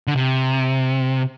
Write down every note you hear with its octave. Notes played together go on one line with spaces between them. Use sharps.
D3
C3